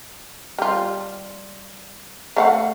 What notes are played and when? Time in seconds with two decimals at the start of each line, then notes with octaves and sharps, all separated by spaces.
0.59 G3 F4
2.37 A3 F5 F#5